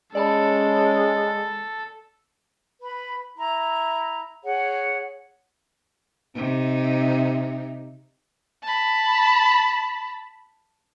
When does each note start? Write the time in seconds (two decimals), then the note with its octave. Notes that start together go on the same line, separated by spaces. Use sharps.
0.15 G#3 C#4 A4 D5 A5 B5
2.81 B4 B5
3.38 E4 A#5
4.44 G#4 C#5 F#5
6.35 C3 D#4
8.63 A5 B5